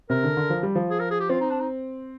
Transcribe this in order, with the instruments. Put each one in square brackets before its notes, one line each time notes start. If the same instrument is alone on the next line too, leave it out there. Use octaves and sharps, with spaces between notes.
[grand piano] C3 [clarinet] A#4
[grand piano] D3
D3
F3
G3
F3
[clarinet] G#4
A#4
G#4
G4
[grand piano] C4 [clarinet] F4
[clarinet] D#4
D4
D#4